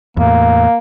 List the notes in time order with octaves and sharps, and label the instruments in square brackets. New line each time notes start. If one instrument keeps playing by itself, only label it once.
[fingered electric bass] E2 A2 [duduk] A#3